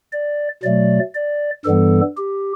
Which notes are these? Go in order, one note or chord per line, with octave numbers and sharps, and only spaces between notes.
D5
B2 F#3 A3 D5
D5
G2 E3 G3 B3 A4
G4